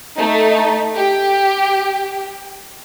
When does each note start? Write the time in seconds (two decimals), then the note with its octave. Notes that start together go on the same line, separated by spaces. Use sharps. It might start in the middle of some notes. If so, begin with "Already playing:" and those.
0.19 A3 D#4
0.95 G4